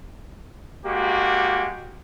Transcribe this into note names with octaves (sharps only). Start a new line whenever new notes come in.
G#3 A#3 F#4 G4